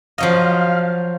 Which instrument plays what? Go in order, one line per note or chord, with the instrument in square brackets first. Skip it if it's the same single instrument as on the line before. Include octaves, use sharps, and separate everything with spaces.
[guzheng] F3 F#3 D#5 [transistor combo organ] F5